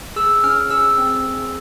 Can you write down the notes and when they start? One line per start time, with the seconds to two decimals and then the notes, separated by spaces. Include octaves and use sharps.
0.16 G#4 E6
0.44 C#4 F6
0.70 G#4 E6
0.98 C4
1.25 G#4